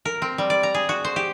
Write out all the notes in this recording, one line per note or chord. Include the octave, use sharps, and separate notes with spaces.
A#4
C4
G3
D5
A#5
G#4
F#4
C5
G4